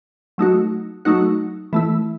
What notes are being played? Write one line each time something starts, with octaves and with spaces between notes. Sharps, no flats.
F#3 A3 D#4 F#4
F#3 A3 D#4 F#4
E3 A3 E4